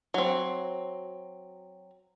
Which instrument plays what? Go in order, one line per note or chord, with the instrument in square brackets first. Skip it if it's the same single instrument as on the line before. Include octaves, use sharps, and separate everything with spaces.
[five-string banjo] F#3 C4